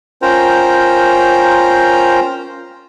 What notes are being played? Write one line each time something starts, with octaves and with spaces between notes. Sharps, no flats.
C#4 F4 A#4 C5 G5 A#5